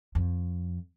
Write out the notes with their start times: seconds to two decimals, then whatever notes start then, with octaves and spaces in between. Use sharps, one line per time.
0.15 F2